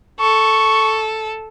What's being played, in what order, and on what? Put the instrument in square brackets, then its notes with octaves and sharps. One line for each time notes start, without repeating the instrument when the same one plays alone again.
[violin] A4 [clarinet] C#6